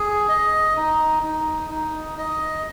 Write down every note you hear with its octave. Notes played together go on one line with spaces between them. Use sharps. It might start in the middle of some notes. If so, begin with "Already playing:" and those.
Already playing: G#4
D#5
D#4
D#4
D#4
D#5